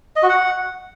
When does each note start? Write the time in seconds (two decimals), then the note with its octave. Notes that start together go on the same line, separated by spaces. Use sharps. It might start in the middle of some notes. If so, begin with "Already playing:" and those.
0.16 D#5
0.23 F#4
0.29 F#5